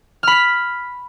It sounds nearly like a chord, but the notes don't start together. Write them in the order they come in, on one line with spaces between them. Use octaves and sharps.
F6 B5 B6